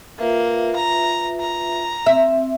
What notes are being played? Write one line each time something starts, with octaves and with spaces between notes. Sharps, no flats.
A#3 F4 B4 E5
A#5
A#5
C4 E5